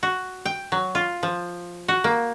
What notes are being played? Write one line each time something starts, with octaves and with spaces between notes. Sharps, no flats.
F#4
G5
F#3
F4
F3
F#4
A#3